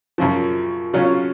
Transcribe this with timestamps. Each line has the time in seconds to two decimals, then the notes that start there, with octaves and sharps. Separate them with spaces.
0.18 F#2 C#3 F3
0.93 C#3 F#3 C#4 F4